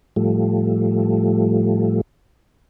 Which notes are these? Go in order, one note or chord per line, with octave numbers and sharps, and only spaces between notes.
A2 F3 G3 A3